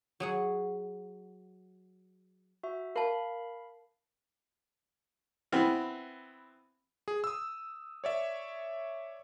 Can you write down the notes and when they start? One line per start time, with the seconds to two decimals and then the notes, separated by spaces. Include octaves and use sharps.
0.20 F#3 G#4 F#5
2.63 F#4 E5
2.96 A#4 F5 A5 B5
5.52 E3 B3 C4
7.08 G#4
7.24 D#6 E6
8.04 C#5 D5 E5